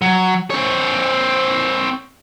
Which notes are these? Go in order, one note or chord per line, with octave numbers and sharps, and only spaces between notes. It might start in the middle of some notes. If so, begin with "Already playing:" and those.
F#3
C4 C#5